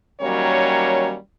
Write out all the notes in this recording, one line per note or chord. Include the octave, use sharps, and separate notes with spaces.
D#3 F#3 G3 A#3 C#4 C#5